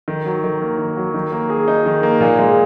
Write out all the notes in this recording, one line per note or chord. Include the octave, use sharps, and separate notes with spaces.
D#3
F#3
D#3
A#3
D#3
F#3
D#3
A#3
G#4
D#4
D#3
A#3
A#2
G#3